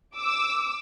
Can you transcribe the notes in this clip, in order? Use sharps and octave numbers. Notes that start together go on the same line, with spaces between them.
D6 E6